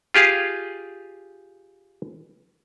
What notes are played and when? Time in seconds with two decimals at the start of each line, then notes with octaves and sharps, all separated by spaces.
0.14 F4 G4 G#4 F5